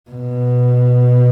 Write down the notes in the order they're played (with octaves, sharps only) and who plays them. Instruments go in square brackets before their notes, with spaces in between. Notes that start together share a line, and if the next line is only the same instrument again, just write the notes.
[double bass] B2